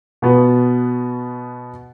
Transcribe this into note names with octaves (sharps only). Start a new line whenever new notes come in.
B2 B3 F#4